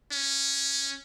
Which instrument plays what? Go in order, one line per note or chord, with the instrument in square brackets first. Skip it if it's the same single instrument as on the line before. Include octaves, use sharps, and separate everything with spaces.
[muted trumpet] C#4